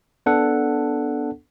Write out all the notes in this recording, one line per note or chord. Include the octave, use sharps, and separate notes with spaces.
B3 D4 A4 F#5